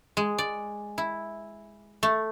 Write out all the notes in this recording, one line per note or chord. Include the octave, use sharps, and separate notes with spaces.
G#3
D5
E4
A3